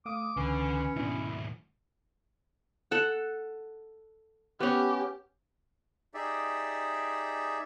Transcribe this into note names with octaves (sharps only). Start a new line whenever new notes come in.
A3 F5 D6 D#6
C#2 D3 E3 C#4 C#6 C7
D#2 G#2 B2 D4 E4
A4 F#5
B3 C#4 G4
D#4 G4 G#4 D5 E5